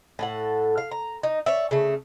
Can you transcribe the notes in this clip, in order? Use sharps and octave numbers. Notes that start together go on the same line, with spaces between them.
A2 A4 F#5
F5
A#5
D#4
C#5 D5 E5
C#3 A3